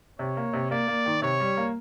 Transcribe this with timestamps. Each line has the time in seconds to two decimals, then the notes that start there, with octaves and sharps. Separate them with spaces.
0.19 C3 C#5
0.37 A#3
0.53 C3
0.71 A#3 D5
0.88 A#3
1.06 D#3
1.22 C3 C#5
1.40 G3
1.57 A#3